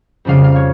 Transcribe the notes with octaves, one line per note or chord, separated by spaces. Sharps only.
F2 C#3 G3 F5
F5
C#5